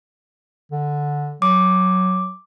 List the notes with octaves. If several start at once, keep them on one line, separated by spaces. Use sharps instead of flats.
D3
F#3 D6